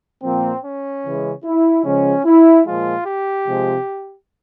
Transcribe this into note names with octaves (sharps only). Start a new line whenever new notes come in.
A#2 F3 A#3 C4
C#4
C#3 E3 G#3
E4
C#3 F3 G#3 C#4
E4
A#2 F3 G#3 F4
G4
C3 F3 G#3